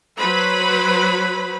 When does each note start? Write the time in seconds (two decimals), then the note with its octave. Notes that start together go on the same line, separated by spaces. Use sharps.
0.19 F#3 B4 C5 B5